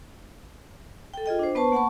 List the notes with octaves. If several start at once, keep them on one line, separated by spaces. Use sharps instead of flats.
A4 G5
F4 G#4 D#5 G5
D4 C5
B3 B4 C5 A5 C#6
A#3 F#5 A5 B5 C#6